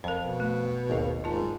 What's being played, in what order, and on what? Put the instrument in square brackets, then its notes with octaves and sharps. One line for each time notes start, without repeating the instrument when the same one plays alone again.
[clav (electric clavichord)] F2 [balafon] A#4 C5
[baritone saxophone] B2
[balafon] A3
[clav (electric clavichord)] G#1 D#2 F5
[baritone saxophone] G#2 [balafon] F4 A5